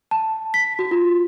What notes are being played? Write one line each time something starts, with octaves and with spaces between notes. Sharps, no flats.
A5
B6
F#4
F4